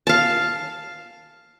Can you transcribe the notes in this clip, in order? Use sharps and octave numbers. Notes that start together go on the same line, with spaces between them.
F5 A5